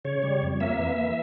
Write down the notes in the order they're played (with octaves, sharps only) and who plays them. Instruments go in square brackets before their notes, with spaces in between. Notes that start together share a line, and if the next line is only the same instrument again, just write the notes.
[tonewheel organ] C#3 C#5
G3
F2
A#3 E5
E3